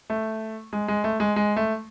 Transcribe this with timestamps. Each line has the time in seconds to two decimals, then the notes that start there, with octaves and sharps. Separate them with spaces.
0.10 A3
0.73 G#3
0.88 G#3
1.04 A3
1.20 G#3
1.36 G#3
1.56 A3